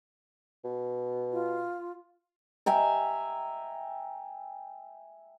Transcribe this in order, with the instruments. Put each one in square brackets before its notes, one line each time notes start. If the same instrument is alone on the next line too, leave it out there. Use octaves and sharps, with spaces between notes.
[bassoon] B2
[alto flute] F4
[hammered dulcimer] E5 G5 G#5 A#5